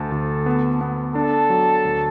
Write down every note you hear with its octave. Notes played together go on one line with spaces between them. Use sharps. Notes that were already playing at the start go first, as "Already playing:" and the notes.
Already playing: D2 A4
D2
B3
B3
D4 A4
F#3
D2